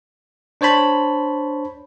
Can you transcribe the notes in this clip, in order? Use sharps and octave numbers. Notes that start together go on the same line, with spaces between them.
D4 C5 C#5 A5 B5